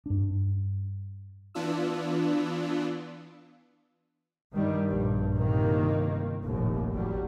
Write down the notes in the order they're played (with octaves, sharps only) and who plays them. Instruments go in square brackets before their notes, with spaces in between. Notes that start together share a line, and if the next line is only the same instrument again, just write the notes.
[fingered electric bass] G2 D4
[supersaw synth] E3 B3 D4 F4 E6
[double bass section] G2 D#3 G3
A#1 G2
G1 C3 D#3 A#3
F1 A#1 D#2 A2
A1 F#3 G3